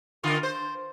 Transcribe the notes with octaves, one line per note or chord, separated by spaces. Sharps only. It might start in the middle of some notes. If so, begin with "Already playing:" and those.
D3 F4 A#4
C5